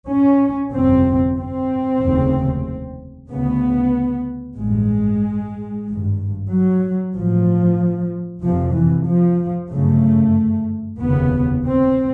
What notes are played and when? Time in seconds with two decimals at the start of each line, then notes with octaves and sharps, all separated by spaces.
0.08 C#4
0.73 G1 F2 C3 C4
1.36 C4
2.01 F1 D#2 C#3
3.29 D2 C#3 B3
4.58 A1 G2 G#3
5.87 G#1 G2
6.51 F#3
7.14 A1 G2 F3
8.43 F1 F2 C3 F3
8.76 E3
9.07 F3
9.71 G1 F#2 C#3 A3
10.99 F1 D#2 C#3 B3
11.64 C4